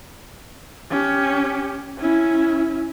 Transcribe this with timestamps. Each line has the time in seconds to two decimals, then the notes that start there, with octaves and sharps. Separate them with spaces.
0.90 C#4 G4
1.99 C#4 E4